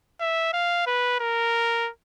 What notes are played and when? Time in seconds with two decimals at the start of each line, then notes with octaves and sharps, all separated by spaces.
0.20 E5
0.53 F5
0.87 B4
1.20 A#4